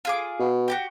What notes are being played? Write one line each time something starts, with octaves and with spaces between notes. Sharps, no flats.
F4 G#4 D6
B2
F#4 G4 G5